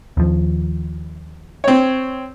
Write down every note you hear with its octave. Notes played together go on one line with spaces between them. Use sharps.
D#2 F3
C4 C#5